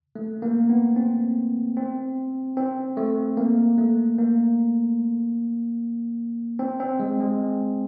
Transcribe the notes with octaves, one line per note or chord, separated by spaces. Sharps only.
A3
A#3
B3
C4
C4
C4
A3
A#3
A3
A#3
C4
C4
G#3
G#3